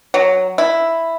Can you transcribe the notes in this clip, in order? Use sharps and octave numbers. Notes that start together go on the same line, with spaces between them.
F#3
E4